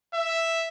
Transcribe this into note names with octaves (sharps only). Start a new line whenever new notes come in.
E5